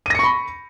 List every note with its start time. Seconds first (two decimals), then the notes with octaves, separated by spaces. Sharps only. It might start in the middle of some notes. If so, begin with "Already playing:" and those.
0.06 D#7
0.10 A#6
0.15 C#7
0.19 C#6
0.23 B5